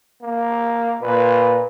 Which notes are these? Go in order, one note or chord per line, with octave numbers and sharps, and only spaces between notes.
A#3
A#2 B4